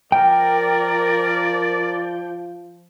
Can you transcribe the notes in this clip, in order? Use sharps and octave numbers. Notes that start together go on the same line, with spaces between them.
F3 A#4 D5 G5